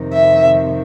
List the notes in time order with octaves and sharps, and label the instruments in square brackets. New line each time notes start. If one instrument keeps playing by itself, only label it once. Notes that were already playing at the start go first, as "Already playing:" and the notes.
Already playing: [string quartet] F2 C3 D#3
E5